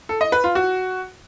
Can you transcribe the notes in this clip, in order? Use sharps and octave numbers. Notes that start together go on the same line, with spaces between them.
A4
D#5
B4
F4
F#4